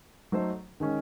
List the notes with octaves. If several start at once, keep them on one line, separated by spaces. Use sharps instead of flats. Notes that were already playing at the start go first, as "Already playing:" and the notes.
F#3 A3 D#4 A4 C5
D#3 G#3 C#4